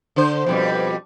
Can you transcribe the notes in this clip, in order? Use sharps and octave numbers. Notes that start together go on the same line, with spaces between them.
D3 C5
F2 B2 G3